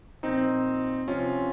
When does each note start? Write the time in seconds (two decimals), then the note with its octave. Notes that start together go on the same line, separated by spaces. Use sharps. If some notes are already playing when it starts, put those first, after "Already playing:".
0.23 A#2 F3 C4 D#4
1.08 C3 F3 C#4 F4